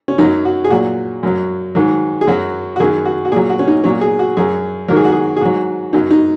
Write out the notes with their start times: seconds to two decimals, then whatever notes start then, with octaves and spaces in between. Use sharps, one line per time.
0.08 C#4
0.18 F#2 F#3 D#4
0.45 F#4
0.64 G#4
0.70 A#2 F#3 F#4
1.23 F#2 F#3
1.75 G#2 D#3 F#3
2.21 G#4
2.27 F#2 F#3 F#4
2.76 F#4
2.80 F#2 D#3 F#3 G#4
3.05 F#4
3.25 F#4
3.32 A#2 G#4
3.36 F#3
3.50 F#4
3.59 C#4
3.67 D#4
3.84 A#2 F#3 C#4
4.01 G#4
4.19 F#4
4.37 F#2 F#3 G#4
4.88 G#2 D#3 F#3 A#4
4.96 G#4
5.05 F#4
5.12 G#4
5.37 G#4
5.41 G#2 F#3 F#4
5.93 F#2 F#3 D#4
6.11 D#4